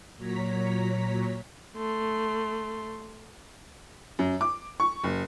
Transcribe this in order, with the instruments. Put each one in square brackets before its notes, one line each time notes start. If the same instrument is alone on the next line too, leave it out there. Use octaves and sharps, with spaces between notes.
[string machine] A#2 F#3 C#5 A#5 B6
[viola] A3 C6
[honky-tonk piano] F#2
D6
C#6
F#1